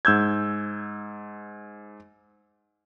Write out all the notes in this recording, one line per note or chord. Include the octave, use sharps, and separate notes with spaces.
G#2 E6 G6 G#6